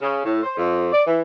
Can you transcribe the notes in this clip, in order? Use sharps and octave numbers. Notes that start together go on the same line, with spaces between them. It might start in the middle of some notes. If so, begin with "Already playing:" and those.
C#3
A2
C5
F2
D5
E3